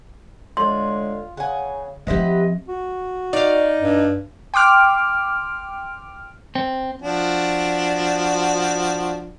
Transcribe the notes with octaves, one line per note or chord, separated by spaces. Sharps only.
A2 D3 G#3 F4 C6
C#3 F#5 G#5
F3 C4 E4 G4 B4 C5 D#5 F#5
F#4
D#4 D5 F5
G2
G5 C6 D6 F6
C4
F3 D4 F#4